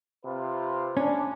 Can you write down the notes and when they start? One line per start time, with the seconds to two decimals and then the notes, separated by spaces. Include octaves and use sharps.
0.24 C3 F4 B4
0.97 C#4 D4